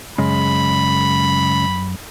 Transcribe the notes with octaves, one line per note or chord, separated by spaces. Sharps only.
F#2 C#3 G#3 B5